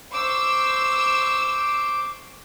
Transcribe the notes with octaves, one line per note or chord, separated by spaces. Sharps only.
C5 C#6 D6 E6